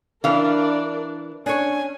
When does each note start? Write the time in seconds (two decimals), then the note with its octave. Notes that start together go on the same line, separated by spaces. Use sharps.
0.24 E3 D4 A#4 D5 F5
1.46 C#4 D4 C#5 G#5